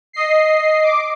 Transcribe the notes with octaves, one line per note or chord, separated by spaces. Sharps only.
D#5 C7
D6